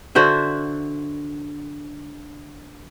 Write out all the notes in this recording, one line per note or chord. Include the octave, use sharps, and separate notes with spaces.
D3 F#4 C5 E5